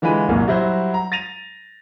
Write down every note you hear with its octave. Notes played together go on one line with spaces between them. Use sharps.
D3 E3 G#3 F4 B5 D#7
C2 F#2 A#2
F#3 G3 E4 F#4 C5
A#5
A6 A#6 D#7 F7